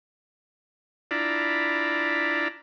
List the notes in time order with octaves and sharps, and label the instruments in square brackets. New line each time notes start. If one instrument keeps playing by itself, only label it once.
[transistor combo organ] D4 E4 F4 D5 A#5 B5